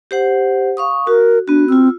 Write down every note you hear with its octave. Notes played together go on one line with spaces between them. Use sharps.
G4 C5 F#5
F5 C#6 D#6
F#4 A#4
B3 D4 F#4
C4 F4 E6